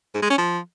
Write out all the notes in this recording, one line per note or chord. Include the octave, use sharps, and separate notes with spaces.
G#2
G#3
C#4
F3